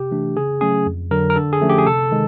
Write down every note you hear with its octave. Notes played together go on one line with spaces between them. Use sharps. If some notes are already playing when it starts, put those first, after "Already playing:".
Already playing: C3 G4
E3 A3 D4
C#3 G#4
F#3 A3 C#4 G#4
F2
D3 F#3 A#4
A#4
D3 A4
G#4
F3 A3 C#4
G4
G#4
C3 A4
D#3 G#3